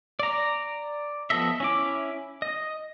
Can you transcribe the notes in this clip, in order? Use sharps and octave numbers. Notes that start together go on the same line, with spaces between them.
D5 A#5
F3 B3 A4 D#5 E5
C#4 E4 D6
D#5